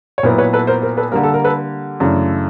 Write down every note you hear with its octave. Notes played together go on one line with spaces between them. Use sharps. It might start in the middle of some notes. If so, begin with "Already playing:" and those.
C#5
A#2 F#3 B3 E4 A#4 C5
B4 C#5
A4 B4
A#4 C5
A#4 C5
A4 B4
D3 G3 A#3 A#4
A4
A#4
A4 B4
F#2 C#3 E3 A3 D4